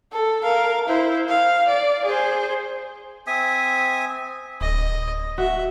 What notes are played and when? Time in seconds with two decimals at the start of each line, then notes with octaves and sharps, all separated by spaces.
0.12 A4
0.43 A#4 F5
0.87 E4 C5
1.29 F5
1.68 D5
2.05 G#4 C5
3.27 C4 E5 G#5 D#6
4.61 D1 D#5
5.38 F#4 E5